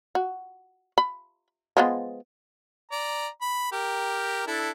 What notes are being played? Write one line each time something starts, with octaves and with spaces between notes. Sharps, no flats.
F#4
B5
F3 G#3 B3
D5 A#5
B5
G4 A#4
D4 E4 A4